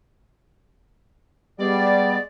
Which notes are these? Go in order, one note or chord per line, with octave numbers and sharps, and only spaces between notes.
G3 G#3 B3 G#4 D5